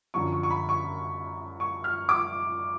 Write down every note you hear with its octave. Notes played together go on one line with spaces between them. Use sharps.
F#2 D3 F3 C#6
C#6
C#6
B5
C#6
C#6
F6
D6